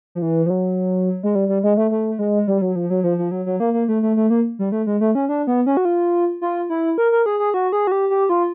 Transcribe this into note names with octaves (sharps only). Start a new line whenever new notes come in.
F3
E3
F3
F#3
G#3
G3
G3
G#3
A3
A3
G#3
G3
F#3
F3
F#3
F3
F3
F#3
F#3
A#3
A#3
A3
A3
A3
A#3
G3
A3
G#3
A3
C#4
D4
B3
C#4
F#4
F4
F4
E4
A#4
A#4
G#4
G#4
F#4
G#4
F#4
G4
G4
F4